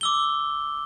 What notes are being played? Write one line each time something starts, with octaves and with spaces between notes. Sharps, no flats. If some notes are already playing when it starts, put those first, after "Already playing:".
D6 E6 G7